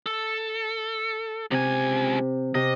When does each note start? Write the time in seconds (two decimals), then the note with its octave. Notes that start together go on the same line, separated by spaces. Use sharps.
0.06 A4
1.51 C#2 C3 G#5
2.55 C3 D#5